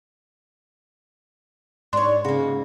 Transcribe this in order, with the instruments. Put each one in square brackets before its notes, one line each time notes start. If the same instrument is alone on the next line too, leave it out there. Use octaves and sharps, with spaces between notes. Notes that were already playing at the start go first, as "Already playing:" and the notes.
[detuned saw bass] G#2 [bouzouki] D4 C#5 [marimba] C6
[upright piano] C#3 [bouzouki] A#3 F#4